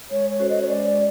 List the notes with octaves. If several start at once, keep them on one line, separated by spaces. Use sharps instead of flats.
G#3 C#5
C#5
C#4 F#4 A4 C5
D#5
C#5
G#3 D5
D5
C#4